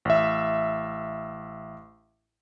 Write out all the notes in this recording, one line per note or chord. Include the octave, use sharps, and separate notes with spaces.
A1 E5